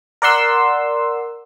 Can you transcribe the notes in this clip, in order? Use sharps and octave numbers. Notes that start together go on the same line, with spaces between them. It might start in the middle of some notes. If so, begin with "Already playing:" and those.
A#4 D5 F#5 C6 E6